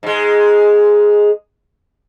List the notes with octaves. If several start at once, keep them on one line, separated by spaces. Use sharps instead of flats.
G#2 G#3